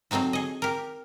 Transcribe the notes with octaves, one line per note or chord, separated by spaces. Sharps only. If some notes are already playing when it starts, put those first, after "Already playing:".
F#3 A3 C4 D#4 F#4
G#4 D#5
G4 A#4